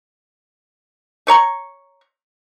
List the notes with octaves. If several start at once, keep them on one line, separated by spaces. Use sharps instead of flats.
A3 C#5 A#5 C#6